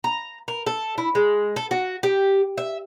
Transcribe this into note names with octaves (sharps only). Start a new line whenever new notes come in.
A#5
A#4
A4
E4
G#3
A4
F#4
G4
E5